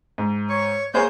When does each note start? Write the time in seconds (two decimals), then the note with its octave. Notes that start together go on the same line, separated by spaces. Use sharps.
0.18 G#2
0.50 C#5 C#6
0.94 A#3 G#4 C5 C#5 G6